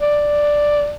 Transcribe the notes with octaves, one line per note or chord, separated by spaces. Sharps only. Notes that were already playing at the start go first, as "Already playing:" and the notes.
D5